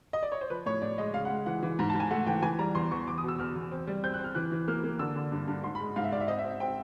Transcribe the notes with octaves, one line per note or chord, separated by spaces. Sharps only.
D#5
D5
C#5
C5
F3 B4
A2 C#5
A2 D5
G#3 D#5
C#3 F5
F#5
G#3
E3 F#5
E3
G#2 A#5
A5
G#2
G#5
A3 F#5
E3 G5
E3 G#5
G3 A#5
E2 C6
E2 C#6
E2 D6
D#6
B2
E6
E2 F6
E2
C4
G3
C4 G6
F#6
C4
F6
E3 F#6
E3
A#3 F6
A#3
D3 E6
D3
G2
G2
G#2 C6
B5
G#3
G#2 F5
E5
G#2 D5
E5
C4 D#5
E5
C4
C4 G5